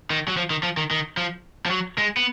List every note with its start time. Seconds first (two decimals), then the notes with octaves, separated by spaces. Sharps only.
0.10 D#3
0.28 F#3
0.37 F3
0.50 D#3
0.63 F3
0.77 D#3
0.91 D#3
1.17 F3
1.66 F3
1.70 F#3
1.98 G#3
2.17 B3